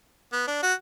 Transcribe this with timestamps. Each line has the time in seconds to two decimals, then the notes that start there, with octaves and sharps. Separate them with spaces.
0.33 B3
0.47 D4
0.63 F#4